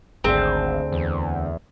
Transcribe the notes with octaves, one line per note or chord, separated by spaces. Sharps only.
G#1 D2 G#2 C4 G#4
E2